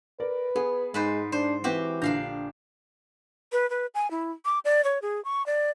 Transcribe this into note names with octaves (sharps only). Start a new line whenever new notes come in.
A#4 B4 D5
B3 G#4
G#2 G#3 B4 C5
D4 C5
E3 C4 F#4 G4 B4
A#1 D3 D4 F5 A#5 G6
B4
B4
G#5
E4
D6
D5
C#5
G#4
C#6
D5